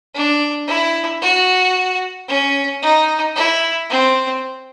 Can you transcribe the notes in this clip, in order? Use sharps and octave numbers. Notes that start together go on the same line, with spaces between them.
D4
E4
F#4
C#4
D#4
E4
C4